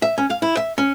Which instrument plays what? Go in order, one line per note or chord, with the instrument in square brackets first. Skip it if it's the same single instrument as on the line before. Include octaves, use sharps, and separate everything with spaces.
[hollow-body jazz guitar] E5
C#4
F5
E4
E5
C#4